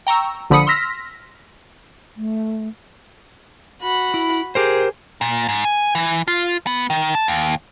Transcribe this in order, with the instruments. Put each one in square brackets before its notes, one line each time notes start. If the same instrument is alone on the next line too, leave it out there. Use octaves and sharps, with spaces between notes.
[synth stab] G5 A#5 C#6 E6
A#1 D3 F3 B5 D#6 C#7
C6 E6 F6 A#6 B6
[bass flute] A3
[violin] F#4 B5
[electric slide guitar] E4
[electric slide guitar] G4 A#4 C5 [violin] G#4
[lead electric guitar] A#2
G#2
G#5
E3
F4
B3
D#3
A5
D#2